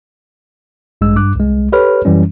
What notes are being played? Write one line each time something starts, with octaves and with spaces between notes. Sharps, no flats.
A1 G2 G#3 E6
G2 D6 F#6
C2 G#3
G4 A4 B4 C#5 B5 F6
F#2 E3 G3 C#4